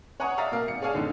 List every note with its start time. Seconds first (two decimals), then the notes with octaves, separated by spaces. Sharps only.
0.20 C#5 F#5 G#5 A#5 C#6 D#6
0.37 D5 E5 F5 A#5 D#6 A6
0.52 B2 A#3 F5
0.68 G#1 C#7
0.82 G#4 C#5 D5 F5 G#5 A5
0.94 F2 A2 D3 D#3